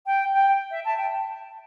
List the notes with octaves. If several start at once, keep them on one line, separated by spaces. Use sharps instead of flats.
G5
G5
E5
A5
G5